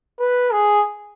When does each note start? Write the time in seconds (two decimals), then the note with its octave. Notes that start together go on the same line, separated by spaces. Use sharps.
0.20 B4
0.53 G#4